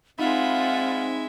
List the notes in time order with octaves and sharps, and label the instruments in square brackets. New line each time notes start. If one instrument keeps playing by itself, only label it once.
[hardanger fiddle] G#3 E5 [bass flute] C4 [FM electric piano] D#4 B5 [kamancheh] F4 F#5